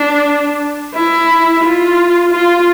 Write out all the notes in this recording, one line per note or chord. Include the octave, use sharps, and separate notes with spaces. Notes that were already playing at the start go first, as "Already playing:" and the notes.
Already playing: D4
E4
F4
F4